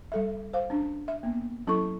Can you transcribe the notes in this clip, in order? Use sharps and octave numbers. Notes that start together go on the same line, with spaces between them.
G3 A4 E5
C5 F5
C#4 D4
E5
A#3 B3
F#3 C#4 E4 A4 C#6